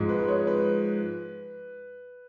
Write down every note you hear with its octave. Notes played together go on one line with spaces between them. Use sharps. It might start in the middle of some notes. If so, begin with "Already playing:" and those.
Already playing: G#2 F3 G#3
B4
C#5
B4